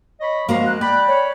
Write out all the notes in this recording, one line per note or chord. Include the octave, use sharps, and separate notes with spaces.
C#5 D#5 B5
F#2 F3 G#3 A#3 F#4 F5 A#5
F#6
D5 G5 B5
C#5